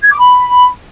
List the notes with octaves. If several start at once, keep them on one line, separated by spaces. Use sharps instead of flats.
G#6
D6
B5